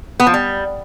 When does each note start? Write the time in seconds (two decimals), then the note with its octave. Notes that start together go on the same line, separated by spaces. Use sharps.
0.20 B3
0.27 F3
0.34 G3